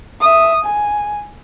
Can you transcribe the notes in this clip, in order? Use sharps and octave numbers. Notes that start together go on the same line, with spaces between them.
E5 D#6
G#5